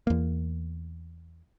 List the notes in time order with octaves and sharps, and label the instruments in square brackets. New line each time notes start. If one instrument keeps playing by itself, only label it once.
[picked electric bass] E2 A#3